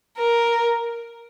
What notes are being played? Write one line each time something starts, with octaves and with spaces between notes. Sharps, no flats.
A#4